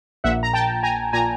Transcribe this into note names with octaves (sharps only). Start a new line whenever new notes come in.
A#1 A#2 E5 F#5
A#5
G5 A5
G#5 A#5
A#2 G#5 A#5